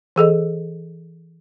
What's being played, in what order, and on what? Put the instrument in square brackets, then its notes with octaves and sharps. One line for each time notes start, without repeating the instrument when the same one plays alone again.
[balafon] E3 G#4 A4 D#5